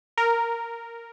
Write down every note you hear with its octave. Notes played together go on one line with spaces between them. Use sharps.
A#4